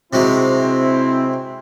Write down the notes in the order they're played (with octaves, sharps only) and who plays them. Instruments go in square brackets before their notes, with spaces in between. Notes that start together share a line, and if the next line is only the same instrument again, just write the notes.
[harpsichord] C3 F#3 G#3 [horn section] C4 E4